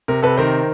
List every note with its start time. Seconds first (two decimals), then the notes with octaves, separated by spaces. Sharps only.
0.08 C3 A#4
0.22 C3 A4 B4
0.37 D#3 A#4 C5